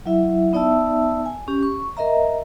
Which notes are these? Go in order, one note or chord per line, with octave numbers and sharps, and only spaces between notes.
F#3 E4 E5
B3 D#4 D5 E5 A5 E6
G#5
C#4 G4
C#6
A#4 D#5 E5 A#5